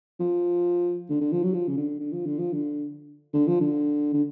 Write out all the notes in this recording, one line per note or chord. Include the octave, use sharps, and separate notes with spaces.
F3
D3
D3
F3
F#3
F3
C#3
D3
D3
F3
D3
F3
D3
D3
F3
D3
D3